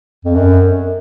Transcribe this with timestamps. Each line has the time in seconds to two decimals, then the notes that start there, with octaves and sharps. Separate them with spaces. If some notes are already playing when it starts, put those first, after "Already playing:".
0.25 F2
0.35 F#2